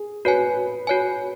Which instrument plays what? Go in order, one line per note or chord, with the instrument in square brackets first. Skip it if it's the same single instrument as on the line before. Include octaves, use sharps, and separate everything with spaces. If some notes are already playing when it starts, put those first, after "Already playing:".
Already playing: [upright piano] G#4
[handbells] F#4 C#5 G#5 [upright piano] B4
[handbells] F#4 C#5 G#5